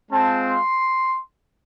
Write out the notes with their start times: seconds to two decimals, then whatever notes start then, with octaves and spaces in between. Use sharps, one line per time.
0.11 G#3 C4 F4 A5
0.45 C6